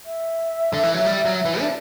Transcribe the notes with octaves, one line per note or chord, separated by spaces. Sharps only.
E5
D3
E3
F#3
G3
F#3
E3
D4